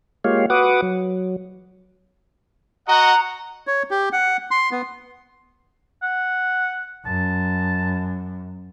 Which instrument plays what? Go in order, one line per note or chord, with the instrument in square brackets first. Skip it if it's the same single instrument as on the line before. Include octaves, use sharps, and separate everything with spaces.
[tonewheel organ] G#3 A#3 F4 G4 C#5 F5
F#4 B4 F#5 D6 D#6
F#3
[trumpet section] F#4 D#5 F#5 [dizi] A#5
[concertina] C#5
G4
F#5
C6
B3
[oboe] F#5
[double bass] F#2 [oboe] A5